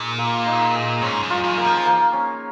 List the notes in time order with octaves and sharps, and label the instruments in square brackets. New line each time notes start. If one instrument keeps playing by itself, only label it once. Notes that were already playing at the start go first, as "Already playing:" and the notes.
Already playing: [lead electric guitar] A#2 [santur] D#4 G#4
[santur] A#3
D#4
G#4
[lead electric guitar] G#2 [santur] C#4
[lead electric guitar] F#2
[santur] F4
[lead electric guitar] F#2
[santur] A#3
[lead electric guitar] F3
[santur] A#3
C#4